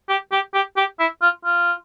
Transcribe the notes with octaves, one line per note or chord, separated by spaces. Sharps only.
G4
G4
G4
G4
E4
F4
F4